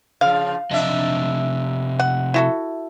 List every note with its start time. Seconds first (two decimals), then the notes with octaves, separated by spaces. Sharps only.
0.21 C#3 F3 F5
0.71 C3 F3 D4 D#5 E5
1.99 F#5
2.34 E4 F#4 A4